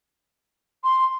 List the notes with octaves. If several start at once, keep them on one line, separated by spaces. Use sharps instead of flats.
C6